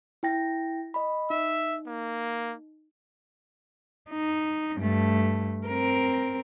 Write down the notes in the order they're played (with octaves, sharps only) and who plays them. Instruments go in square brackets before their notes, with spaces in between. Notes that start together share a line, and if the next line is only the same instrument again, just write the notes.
[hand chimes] E4 G5 A#6
D#5 B5
[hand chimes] D#4 [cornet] E5
[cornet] A#3
[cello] D#4
G2 A3
C4 A#4